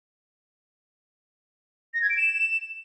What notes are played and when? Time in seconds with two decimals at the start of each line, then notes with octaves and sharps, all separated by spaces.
1.94 A#6
2.02 G#6
2.10 D7
2.17 E7